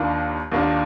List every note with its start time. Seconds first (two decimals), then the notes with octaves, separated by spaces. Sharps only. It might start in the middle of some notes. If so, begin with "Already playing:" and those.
Already playing: D#2 D#3 A#3 D4 F4
0.52 D#2 D#3 A#3 D4 F4